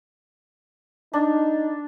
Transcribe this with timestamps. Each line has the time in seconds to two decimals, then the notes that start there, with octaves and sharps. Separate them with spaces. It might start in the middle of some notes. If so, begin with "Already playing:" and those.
1.13 D4 D#4